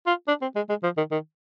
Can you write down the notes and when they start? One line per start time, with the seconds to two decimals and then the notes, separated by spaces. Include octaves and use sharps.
0.06 F4
0.28 D4
0.42 C4
0.56 G#3
0.69 G#3
0.83 F3
0.97 D#3
1.11 D#3